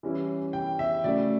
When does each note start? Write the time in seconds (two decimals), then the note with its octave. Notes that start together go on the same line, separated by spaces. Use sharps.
0.03 E3 G3 C#4 E4
0.53 G5
0.79 E5
1.04 C#3 F#3 A3 D5